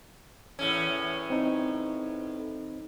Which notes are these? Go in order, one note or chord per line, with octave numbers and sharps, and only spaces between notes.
E2 A2 C#4
C4 D#4